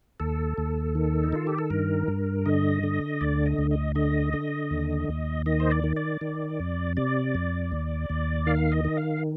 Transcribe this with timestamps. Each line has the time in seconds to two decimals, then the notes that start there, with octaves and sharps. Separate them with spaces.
0.20 D#2 A4
0.58 D#2
0.95 D#3
1.24 D#4
1.33 D#3 F4
1.47 G4
1.58 A4
1.70 G2 A#4
2.08 G2
2.46 D3 D#5
2.83 D3
3.21 D2 D5
3.46 D#5
3.58 D2
3.71 D#5
3.95 D3 D#5
4.34 D3
4.71 D#2
5.09 D#2
5.46 D#3 D#5
5.60 C5
5.71 D5
5.84 D#3
5.96 D5
6.21 D#3
6.60 F2
6.97 C3 D5
7.35 F2
7.72 D#2
8.10 D#2
8.47 D#3 F5
8.72 D#5
8.85 D#3
8.97 F5